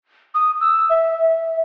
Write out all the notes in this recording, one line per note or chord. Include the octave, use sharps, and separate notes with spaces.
D#6
E6
E5